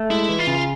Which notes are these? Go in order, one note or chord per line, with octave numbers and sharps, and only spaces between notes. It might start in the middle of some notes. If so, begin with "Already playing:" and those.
Already playing: A3
G#3 E4
E3
F4
C#3